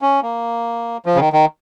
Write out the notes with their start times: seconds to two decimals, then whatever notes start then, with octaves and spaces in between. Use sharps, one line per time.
0.02 C#4
0.22 A#3
1.06 F3
1.15 C#3
1.20 D#3
1.33 D#3